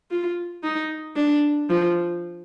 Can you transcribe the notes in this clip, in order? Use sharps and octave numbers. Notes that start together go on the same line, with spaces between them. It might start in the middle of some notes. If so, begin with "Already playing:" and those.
F4
D#4
D4
F3